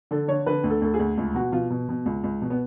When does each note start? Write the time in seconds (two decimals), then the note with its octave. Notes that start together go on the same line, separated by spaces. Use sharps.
0.11 D3 A4
0.28 D3 C#5
0.46 D3 B4
0.64 D2
0.70 A4
0.81 D2 A4
0.94 G#4
0.99 D2
1.17 C#2
1.35 B2 F#4
1.52 B2 F4
1.70 B2
1.89 B2
2.06 C#2
2.24 C#2
2.42 B2
2.50 B3